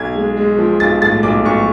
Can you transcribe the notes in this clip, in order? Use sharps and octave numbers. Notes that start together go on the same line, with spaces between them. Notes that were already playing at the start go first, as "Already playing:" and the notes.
Already playing: B1 G#6
G#3
G#3
F3
B1 A6
A2 A6
B1 D6
B1 C#6